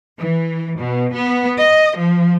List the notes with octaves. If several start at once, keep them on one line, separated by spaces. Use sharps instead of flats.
E3
B2
B3
D#5
F3